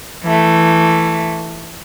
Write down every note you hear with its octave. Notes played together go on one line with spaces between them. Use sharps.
E3 A3